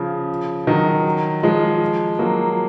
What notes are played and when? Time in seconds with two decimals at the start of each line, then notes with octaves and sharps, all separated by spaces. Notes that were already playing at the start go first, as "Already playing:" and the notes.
Already playing: C#3 F3
0.67 D#3 F#3
1.43 F3 G#3
2.19 F#3 A#3